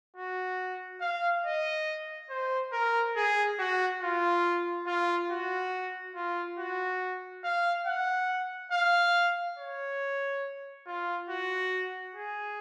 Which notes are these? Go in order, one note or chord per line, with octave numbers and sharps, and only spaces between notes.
F#4
F5
D#5
C5
A#4
G#4
F#4
F4
F4
F#4
F4
F#4
F5
F#5
F5
C#5
F4
F#4
G#4